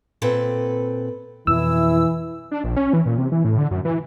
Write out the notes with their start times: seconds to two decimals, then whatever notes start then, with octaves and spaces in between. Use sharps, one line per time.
0.22 A#2 C4 A4 B4
1.47 F2 B2 E3 E4 E6
2.51 D4
2.64 A#1
2.76 C#4
2.93 E3
3.06 A#2
3.18 C3
3.32 E3
3.45 A2
3.58 D3
3.71 F#2
3.85 E3